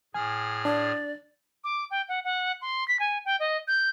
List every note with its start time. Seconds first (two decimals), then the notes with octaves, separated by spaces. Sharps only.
0.14 A2 G#4 G#5 F6
0.65 D4 D5
1.64 D6
1.91 G5
2.09 F#5
2.24 F#5
2.61 C6
2.88 B6
3.00 G#5
3.25 G5
3.40 D#5
3.68 G6